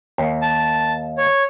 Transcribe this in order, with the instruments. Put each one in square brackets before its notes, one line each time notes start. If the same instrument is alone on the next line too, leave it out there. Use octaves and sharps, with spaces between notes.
[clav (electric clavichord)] D#2
[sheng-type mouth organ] A5
C#5